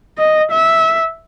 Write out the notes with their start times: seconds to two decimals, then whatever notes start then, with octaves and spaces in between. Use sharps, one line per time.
0.18 D#5
0.52 E5